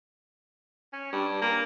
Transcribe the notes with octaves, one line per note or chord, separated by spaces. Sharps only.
C#4
G2
A#3